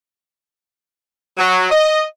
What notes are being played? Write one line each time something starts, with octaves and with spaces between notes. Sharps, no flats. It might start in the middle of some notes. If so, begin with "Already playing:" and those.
F#3
D#5